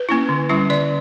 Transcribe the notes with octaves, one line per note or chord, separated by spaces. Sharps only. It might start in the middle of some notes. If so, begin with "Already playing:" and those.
Already playing: B4
A#3 C#4 E4
D3
G3 C#4 E4
D3 D5